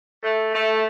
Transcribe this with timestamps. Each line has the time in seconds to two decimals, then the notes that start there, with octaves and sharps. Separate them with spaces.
0.23 A3
0.54 A3